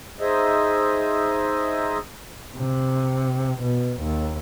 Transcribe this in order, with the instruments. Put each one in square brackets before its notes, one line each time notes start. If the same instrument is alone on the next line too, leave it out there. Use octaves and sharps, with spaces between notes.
[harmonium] D#4 G#4 C5 D#5 E5
[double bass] C3
B2
D#2